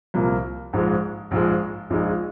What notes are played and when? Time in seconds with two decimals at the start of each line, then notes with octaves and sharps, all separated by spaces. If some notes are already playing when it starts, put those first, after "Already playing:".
0.14 C2 A#2 F3 A#3
0.73 A#1 G#2 F3 G#3
1.31 A#1 G#2 F3 G#3
1.90 A#1 A#2 G#3 D#4